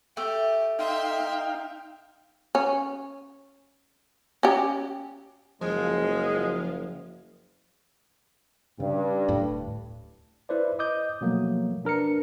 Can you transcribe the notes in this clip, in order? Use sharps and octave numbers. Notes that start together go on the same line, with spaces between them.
A3 G4
D#4 E5 F5 G5 C6
C#4
C#4 G4
F#1 F3 G#3
G2 C#3
D1 A2
E4 B4 C5 D5
D#5 D6 D#6 G6
B2 F3 F#3 A3 A#3
D4 A#4 B4 C#7